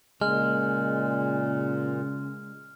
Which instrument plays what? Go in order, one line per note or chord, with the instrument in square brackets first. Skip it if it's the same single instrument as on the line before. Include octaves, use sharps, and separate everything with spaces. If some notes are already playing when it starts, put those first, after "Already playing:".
[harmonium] A#2 [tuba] C#3 [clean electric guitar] G#3 [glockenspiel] F6